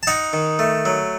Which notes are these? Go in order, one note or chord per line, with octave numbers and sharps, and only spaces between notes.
A5
D#4 F#5 A#5
D#3
A3
F#3